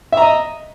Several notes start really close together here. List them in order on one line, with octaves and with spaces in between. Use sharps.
E5 A#5 D#5